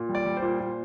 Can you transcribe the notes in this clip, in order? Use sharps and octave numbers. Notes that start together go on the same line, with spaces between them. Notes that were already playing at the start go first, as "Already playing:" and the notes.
Already playing: A#2
G3
D5
G3
C5
A#2
A#2